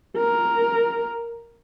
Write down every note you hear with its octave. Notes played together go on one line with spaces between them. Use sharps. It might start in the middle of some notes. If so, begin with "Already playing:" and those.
A#4